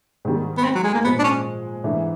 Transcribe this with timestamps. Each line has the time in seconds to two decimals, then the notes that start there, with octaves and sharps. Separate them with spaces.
0.25 G#2 D#3 G3
0.57 B3
0.64 C4
0.75 F#3
0.84 G#3
0.94 A#3
1.04 A#2 F3 G#3 B3
1.19 D4
1.24 C#4
1.84 G#2 E3 A3 D4